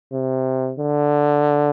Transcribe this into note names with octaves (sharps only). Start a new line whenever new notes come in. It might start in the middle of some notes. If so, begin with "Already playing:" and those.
C3
D3